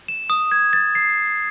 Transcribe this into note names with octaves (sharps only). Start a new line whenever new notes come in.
E7
D#6
G#6
A6
C7